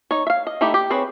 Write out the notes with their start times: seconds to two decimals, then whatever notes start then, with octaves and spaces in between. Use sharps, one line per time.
0.11 D#4 C#5
0.27 E5 F5
0.47 D#5
0.61 A3 D#4 E4 G4
0.74 G4
0.90 C4 G#4 B4 C#5